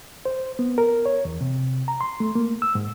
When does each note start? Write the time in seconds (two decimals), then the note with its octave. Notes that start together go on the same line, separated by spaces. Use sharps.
0.25 C5
0.59 B3
0.78 A#4
1.06 C#5
1.25 E2
1.41 C3
1.88 A#5
2.01 C6
2.20 A3
2.35 A#3
2.62 E6
2.75 G#2